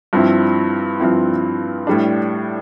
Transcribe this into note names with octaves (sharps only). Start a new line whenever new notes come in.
G2 F3 C4 E4
G2 F3 C4 E4
A2 G3 D4